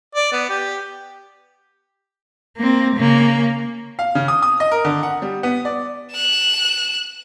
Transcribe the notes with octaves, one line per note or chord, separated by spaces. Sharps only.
D5
B3
G4
A#3 C4
C#3 A#3
F5
C#3
D#6
D#6
D#5
A#4
D3
F#5
G3
B3
D5
F#6 E7